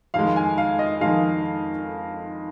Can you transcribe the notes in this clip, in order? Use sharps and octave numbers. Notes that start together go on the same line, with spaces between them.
F2 D#3 G#3 F5
G#5
F5
D#5
F2 D#3 G#3 F5